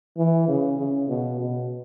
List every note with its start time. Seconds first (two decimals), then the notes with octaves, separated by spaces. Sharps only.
0.17 E3
0.48 C#3
0.78 C#3
1.09 B2
1.40 B2